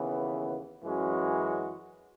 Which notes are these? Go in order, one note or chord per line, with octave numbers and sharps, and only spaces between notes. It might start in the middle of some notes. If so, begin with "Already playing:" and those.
Already playing: D#2 C#3 E3 B3
F#2 E3 G#3 C#4 F#4